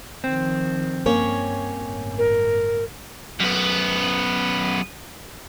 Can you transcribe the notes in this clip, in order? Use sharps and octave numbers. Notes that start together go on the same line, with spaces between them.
D#3 F3 C4
G2 A#3 C#4 C#5
G1 A2
A#4
F#2 B3